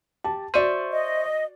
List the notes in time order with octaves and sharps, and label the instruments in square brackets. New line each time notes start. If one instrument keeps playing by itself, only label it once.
[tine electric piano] G4 [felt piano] A5
[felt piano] F#4 D5 D#7 [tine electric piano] C5 E5 C#6
[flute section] D#5